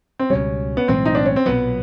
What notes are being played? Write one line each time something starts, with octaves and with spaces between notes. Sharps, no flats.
C4
C#2 B2 G3 C#4
B3
B1 A2 E3 G#3 C4
D#4
D4
C#4
C4
B1 A#2 F#3 B3